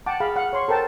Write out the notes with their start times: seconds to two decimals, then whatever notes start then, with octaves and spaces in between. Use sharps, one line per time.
0.06 F#5 G5 A5 D6
0.20 G#4 F5 B5
0.36 F5 F#5
0.53 C#5 C6 C#6
0.68 A4 A#4 C5 G5 A5